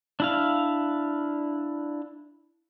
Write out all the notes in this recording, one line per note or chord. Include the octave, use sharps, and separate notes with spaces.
D4 E4 F5